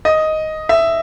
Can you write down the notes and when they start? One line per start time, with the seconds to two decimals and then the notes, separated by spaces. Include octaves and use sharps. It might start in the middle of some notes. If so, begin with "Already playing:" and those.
0.05 D#5
0.69 E5